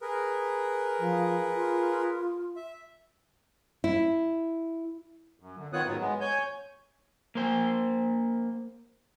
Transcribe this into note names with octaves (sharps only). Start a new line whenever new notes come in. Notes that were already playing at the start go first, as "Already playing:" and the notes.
G#4 A#4 B4
F3
F4
E5
E4
F#2
D3
D#3 B3 F4 C#5 D#6 F#6
G#2 D#3 F#3
G#3 B3
C#5 G#5 G6
A#3 C5